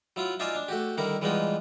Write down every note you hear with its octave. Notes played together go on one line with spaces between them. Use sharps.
F#3 E4 F4
D#4 F4 D5 E5 F5 G#5
D4
A3 F#4 G4
D3 D#3 G3 E4 A#4
E3 G3 G#3 B3 D#4 F4